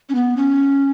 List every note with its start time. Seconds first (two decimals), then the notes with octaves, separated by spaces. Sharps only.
0.09 C#4
0.15 B3
0.37 C#4